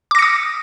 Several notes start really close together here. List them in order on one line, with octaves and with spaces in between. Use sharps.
D6 A#6 C#7 D#6